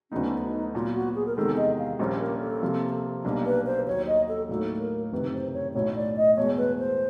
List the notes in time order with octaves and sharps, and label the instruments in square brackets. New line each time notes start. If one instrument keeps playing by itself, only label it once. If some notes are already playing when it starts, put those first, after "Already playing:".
[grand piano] D2 D3 F#3 B3 D#4 [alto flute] C#4
[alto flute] D#4
[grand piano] A#2 F#3 B3 [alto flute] F4
[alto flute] F#4
G#4
A#4
[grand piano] E2 C3 D#3 G#3 [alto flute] A4
[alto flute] D#5
F5
[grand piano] A#1 A#2 G3 A#3 C#4 [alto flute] C5
[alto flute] A#4
A4
[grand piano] C3 F3 A#3
B1 B2 G3 A#3 D4
[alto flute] B4
C5
[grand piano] D#2 D#3 F#3 [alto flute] C#5
[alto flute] D#5
A4
[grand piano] A2 F#3 A#3 D#4 F#4 [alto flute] A4
[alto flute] A#4
[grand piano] F#1 F2 C3 D#3 [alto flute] B4
[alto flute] C5
C#5
[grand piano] B1 A2 F#3 [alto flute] C#5
[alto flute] D5
D#5
[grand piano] E2 B2 G#3 [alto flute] C#5
[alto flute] B4
C5